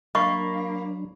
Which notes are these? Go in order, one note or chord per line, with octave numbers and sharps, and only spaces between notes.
F#3 A#3 D4 D#5 B5 C#6